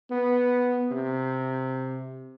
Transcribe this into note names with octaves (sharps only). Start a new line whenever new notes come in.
B3
C3